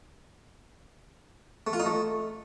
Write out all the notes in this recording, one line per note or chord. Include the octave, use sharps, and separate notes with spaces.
A3
F4
D#4
A3